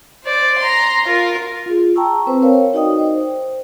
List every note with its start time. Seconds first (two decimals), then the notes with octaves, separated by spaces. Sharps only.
0.24 C5 D5
0.58 A#5 C6
1.05 F4 A#4
1.66 F4 G#4
1.96 G5 A5 A#5 C#6 E6
2.27 C4 B4 C5
2.42 A#4 C#5 F5
2.74 D#4 F#4 D5 D#5 G5 D#6
2.99 C5